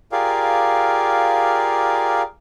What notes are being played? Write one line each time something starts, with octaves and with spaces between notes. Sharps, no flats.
F4 G4 G#4 A#4 D5 F5